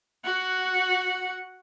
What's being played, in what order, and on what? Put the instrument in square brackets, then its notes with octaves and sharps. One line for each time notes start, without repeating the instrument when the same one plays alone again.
[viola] F#4 F#5